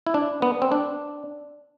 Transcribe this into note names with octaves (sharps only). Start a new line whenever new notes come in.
E4
D4
B3
C4
D4